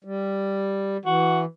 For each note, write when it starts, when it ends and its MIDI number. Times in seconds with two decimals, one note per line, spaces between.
0.04 0.97 55
1.05 1.45 52
1.05 1.41 66